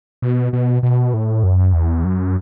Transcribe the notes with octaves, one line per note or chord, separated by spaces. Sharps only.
B2
B2
B2
A2
F#2
E2
F#2